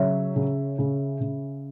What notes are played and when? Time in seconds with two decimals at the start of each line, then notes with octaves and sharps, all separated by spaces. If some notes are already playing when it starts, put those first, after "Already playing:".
Already playing: C#3 F#3 C#5 E5
0.36 C#3
0.79 C#3
1.21 C#3